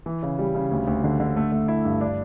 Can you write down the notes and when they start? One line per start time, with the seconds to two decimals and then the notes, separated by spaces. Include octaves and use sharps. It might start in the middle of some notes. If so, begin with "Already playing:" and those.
0.06 E3
0.23 C#3
0.39 G3
0.55 C#3
0.71 D2
0.87 D2
1.04 D3
1.20 D3
1.36 A3
1.52 A3
1.68 E4
1.85 G2
2.01 D4